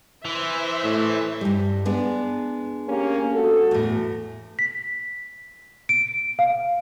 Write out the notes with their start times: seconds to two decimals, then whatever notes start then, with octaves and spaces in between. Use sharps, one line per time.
0.25 E3 C5 E5
0.84 A2
1.41 G2 G3
1.85 G#3 B3 D4
2.88 A#3 C#4 G4
3.33 F#4 A4
3.71 E2 A2
4.59 B6
5.89 D7
6.39 F5